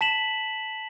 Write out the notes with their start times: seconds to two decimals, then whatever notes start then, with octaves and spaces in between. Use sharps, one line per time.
0.01 A5 B6 E7 F#7